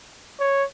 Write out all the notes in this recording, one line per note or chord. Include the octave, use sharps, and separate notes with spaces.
C#5